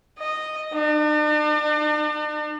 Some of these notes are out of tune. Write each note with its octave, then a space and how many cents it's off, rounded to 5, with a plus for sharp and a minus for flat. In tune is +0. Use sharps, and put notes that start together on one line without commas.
D#5 -10
D4 +45